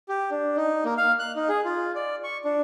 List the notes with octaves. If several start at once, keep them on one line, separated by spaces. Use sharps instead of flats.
G4
D4
D#4
A#3
F5
F#6
D#4
G#4
F4
D5
C#6
D4